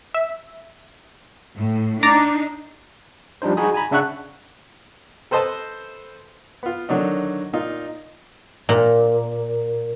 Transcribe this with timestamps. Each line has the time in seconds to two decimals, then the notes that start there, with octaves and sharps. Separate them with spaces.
0.14 E5
1.57 A2
2.03 D4 D#4 A#5 D6 A6
3.42 F3 G3 D4 D#4 C5
3.57 D#4 F#4 G#4 G#5 B5 D#6
3.74 G#5 A#5 B5
3.91 C#3 D4 E5 F#5 C#6 F#6
5.31 A4 B4 C5 D#5 A5
6.63 B3 F4
6.89 D3 D#3 F#3 D4 D#4
7.53 A#2 D#4 F4
8.69 A#2